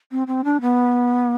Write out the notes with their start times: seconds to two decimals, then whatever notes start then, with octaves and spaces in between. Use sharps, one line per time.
0.12 C4
0.27 C4
0.44 D4
0.61 B3